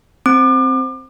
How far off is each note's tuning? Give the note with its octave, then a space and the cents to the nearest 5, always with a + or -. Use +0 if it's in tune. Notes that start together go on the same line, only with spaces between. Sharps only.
C4 +0 D6 +35